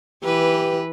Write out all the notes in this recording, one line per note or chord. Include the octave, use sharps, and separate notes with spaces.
E3 G4 B4